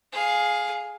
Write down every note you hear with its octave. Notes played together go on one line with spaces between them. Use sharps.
G#4 F5